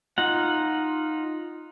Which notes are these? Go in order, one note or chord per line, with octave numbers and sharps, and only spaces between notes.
D#4 F4 F#5